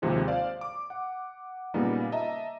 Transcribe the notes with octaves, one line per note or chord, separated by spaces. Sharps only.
D#2 C3 F3 G#3
C5 D5 F5
D6
F#5
A#2 C#3 G3 A#3 B3 D#4
D#5 E5 A5 A#5